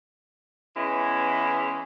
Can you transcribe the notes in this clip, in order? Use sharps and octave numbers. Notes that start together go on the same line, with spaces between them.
E2 E3 G#3 C#4 E4